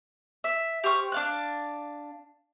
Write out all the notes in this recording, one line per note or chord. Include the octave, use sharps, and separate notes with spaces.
E5
G4 C5 C#6 F6
D4 F5 F#6